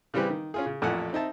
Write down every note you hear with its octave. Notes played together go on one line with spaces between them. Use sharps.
C#3 E3 G3 C4 G4 B4
D#3
C#4 F4 G#4
C#3
A1 F2 A#2 A4 F#5 G#5
C4 D#4 E5 A5